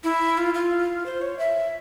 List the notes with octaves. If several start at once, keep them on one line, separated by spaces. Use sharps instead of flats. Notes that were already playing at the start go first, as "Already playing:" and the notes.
E4
F4
F4
C5
C#5
E5